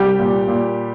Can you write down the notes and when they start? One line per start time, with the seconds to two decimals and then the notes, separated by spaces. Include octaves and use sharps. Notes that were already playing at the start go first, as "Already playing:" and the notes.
Already playing: C2 G3 G4
0.19 A#2
0.48 A#2